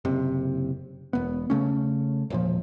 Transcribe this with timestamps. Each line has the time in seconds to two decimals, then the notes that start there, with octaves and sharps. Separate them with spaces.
0.05 F#1 C3
1.13 E1 B3
1.50 C#3 A3 C#4
2.30 E1 A#2 F3